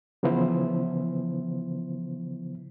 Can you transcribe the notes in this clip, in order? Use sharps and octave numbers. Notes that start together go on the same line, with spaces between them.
C#3 E3 F3 B3 E4 C5